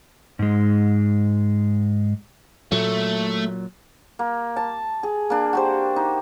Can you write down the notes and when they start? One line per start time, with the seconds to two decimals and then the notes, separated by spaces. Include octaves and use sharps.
0.39 G#2 G#3
2.72 A#2 F#3 A3
4.19 A#3
4.56 A5
5.03 G#4
5.30 A#3 D4
5.53 F#4 G4 C5
5.96 D#4